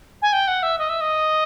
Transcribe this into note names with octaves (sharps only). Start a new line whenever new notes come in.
G#5
G5
F#5
E5
D#5
E5
D#5